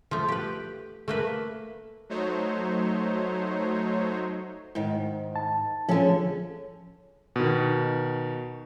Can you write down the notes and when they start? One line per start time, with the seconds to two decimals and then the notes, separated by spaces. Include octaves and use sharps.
0.11 F3 A3
0.28 G4 B4
1.08 A3 A#3 B4
2.09 F#3 A3 D#4 C5 C#5
4.75 G#2 D#3
5.36 A5
5.89 D3 F3 C#4 G#4 A4
7.36 B2 D#3